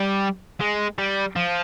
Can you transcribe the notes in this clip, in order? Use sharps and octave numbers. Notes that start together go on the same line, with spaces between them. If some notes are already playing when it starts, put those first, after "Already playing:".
Already playing: G3
G#3
G3
F3